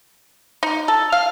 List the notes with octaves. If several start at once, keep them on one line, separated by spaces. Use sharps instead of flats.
D#4
A4
F5